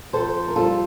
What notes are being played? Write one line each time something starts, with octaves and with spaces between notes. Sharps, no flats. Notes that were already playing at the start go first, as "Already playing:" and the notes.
F2 A4 C5
A#4
G3 F4 A4